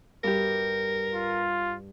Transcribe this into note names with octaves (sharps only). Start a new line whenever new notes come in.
G2 G4 A#4
F4